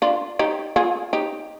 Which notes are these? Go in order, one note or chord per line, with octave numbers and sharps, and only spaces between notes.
D4 F4
D#4 G4
F4 G#4
D#4 G4